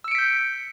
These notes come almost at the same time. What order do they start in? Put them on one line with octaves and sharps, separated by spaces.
E6 C#7 D7 B6 G6